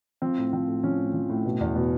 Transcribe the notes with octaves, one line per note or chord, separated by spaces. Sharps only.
F3 C4
A2
F3 C4
A2
F3 C#4
A2
F3
A2
B2
E2
B2